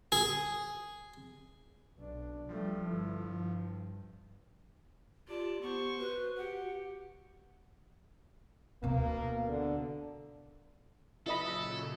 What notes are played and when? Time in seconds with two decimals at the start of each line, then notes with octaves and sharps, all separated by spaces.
0.12 G#4
1.99 B1 D4
2.49 F3 G3 A3
2.89 G1 E4
3.27 G2
5.28 F4 G4 D5 A5
5.62 B3 C5 C#6
5.98 F#4 B4
6.37 G4 F#5
8.83 D2 B2 A#3
9.48 D3
11.26 A#2 C#3 F#3 E4 A4 D#5 B5